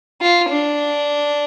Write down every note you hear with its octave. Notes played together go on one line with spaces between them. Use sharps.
F4
D4